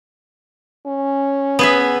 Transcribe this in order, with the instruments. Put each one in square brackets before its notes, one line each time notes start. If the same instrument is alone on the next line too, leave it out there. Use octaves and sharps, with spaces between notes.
[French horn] C#4
[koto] B3 G#4 E5